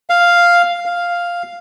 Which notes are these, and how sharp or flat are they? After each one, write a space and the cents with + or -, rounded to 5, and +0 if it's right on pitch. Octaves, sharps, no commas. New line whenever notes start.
F5 +0
F5 +0